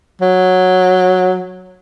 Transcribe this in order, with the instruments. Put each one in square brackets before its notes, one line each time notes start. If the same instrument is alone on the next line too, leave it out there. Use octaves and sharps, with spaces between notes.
[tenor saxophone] F#3